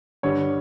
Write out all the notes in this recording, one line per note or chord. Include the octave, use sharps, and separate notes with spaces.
G2 D3 G3 C#5